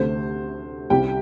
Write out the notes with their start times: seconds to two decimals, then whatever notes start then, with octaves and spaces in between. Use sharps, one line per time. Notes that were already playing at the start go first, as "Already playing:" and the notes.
Already playing: D2 C3 A3 C5
0.90 C2 C3 G3 G4 G5